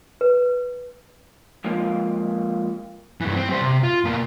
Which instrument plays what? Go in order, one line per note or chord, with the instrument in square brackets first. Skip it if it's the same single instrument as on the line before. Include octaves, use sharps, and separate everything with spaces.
[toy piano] B4
[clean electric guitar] F3 G#3 A#3 F4
[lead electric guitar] G2 E3
C4
G3 C5
C3
F4
B2 A#3